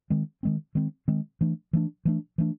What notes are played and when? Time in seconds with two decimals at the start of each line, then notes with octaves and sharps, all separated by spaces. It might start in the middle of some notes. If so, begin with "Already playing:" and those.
0.10 D#3 G#3 C4
0.43 D#3 G#3 C4
0.75 D#3 G#3 C4
1.08 D#3 G#3 C4
1.41 E3 A3 D4
1.73 E3 A3 D4
2.05 E3 A3 D4
2.38 E3 A3 D4